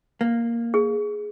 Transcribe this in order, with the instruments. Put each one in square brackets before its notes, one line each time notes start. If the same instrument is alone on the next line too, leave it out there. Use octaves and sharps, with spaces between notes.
[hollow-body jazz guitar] A#3
[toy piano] G#4